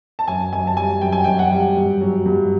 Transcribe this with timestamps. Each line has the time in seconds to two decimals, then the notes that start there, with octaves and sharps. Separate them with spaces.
0.19 A5
0.28 F#2 G#5
0.52 F#2 G#5
0.67 A5
0.77 G3 G#5
1.01 F#2 G5
1.12 G#5
1.24 F#2 G5
1.39 F#5
1.51 G3
1.76 G2
2.01 F#3
2.26 G2